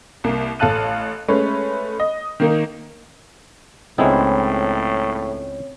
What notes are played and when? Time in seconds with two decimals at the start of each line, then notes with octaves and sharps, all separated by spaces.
0.24 C2 A#3
0.59 A1 A4 F5 A5 F#6 D#7
1.28 G#3 A3 C#4 B4 C#5
2.00 D#5
2.40 D#3 A#3 D#4
3.98 C#2 A2 G#3 B3 C4 D#4 E4 C#5